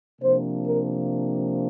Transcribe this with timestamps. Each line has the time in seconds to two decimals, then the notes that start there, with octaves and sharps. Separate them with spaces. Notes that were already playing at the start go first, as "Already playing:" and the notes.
0.21 C3 F3 A#3 D4 C5
0.66 A#4